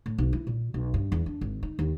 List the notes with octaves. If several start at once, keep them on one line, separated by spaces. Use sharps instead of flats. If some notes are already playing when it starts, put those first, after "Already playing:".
A2
B1
E4
A#2
B1
G2
E2
D4
G#1
D#4
D#2